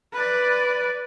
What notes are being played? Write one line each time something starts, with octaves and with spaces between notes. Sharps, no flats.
B4 D5